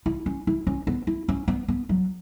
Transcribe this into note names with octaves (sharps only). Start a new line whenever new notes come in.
E4
C#4
E4
C#4
B3
E4
C#4
B3
B3
F#3